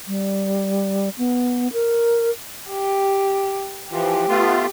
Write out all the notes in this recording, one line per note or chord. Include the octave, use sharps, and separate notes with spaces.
G3
B3
A#4
G4
E3 F3 G4
A3 B3 F4